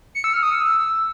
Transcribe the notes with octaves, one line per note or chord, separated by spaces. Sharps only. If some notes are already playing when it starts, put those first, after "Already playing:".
C#7
E6
F6
D#6
E6